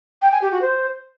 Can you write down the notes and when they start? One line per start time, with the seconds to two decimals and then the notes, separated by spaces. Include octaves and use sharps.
0.22 G5
0.32 G#5
0.42 G4
0.52 F#4
0.62 C5